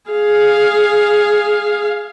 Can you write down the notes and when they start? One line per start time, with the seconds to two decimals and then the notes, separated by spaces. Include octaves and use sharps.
0.10 G#4 F5